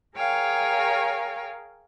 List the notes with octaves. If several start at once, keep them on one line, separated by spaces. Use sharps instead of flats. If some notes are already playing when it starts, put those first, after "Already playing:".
G#4 A#4 C#5 F5 G5 G#5